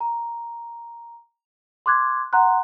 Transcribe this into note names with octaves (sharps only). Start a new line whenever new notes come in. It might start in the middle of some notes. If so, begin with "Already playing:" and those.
A#5
C6 D6 F#6 G#6
F#5 A#5 C6 F#6